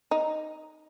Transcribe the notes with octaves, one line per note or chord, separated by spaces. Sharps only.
D#4